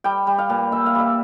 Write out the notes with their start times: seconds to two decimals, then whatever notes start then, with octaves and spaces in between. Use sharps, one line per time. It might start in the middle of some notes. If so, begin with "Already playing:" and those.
0.04 G3 G5
0.27 G3
0.38 F5
0.49 A#2
0.72 A#2 E5
0.86 F5
0.95 G3 E5